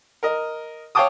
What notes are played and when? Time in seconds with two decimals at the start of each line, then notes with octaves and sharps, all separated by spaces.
0.23 A#4 D#5
0.95 C#5 F5 G5 A5 D6 D#6